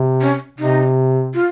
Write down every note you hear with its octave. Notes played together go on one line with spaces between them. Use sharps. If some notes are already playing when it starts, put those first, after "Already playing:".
Already playing: C3
C#4
C3 D#4
F4